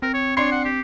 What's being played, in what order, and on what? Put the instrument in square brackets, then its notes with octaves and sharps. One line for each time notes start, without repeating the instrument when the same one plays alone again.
[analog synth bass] C4 [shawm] A#4
[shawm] C#5
[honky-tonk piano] D4 C6 C7 [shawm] C#5
[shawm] F#5
G4